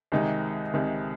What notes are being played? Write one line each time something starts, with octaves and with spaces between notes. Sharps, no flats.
C2 C3 D#3 G#3 D#4
C2 C3 D#3 G#3 D#4